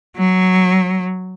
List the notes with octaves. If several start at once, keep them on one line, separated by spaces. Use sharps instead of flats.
F#3